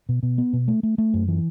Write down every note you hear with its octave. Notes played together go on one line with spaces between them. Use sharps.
B2
B2
B3
B2
A3
A3
A3
F#2
E3